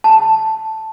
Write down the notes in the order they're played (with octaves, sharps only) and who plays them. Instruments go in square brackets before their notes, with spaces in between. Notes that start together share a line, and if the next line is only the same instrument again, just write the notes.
[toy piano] A5